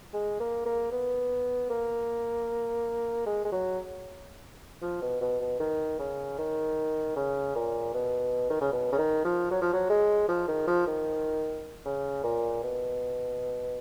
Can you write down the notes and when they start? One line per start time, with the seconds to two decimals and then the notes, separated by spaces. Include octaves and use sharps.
0.14 G#3
0.40 A#3
0.66 A#3
0.92 B3
1.70 A#3
3.26 G#3
3.45 G#3
3.52 F#3
4.82 F3
5.02 B2
5.21 B2
5.41 B2
5.60 D#3
5.99 C#3
6.38 D#3
7.16 C#3
7.56 A#2
7.94 B2
8.50 D#3
8.61 C#3
8.72 B2
8.92 C#3
8.98 D#3
9.25 F3
9.51 F#3
9.62 F3
9.73 F#3
9.89 G#3
10.28 F3
10.48 D#3
10.67 F3
10.87 D#3
11.85 C#3
12.24 A#2
12.63 B2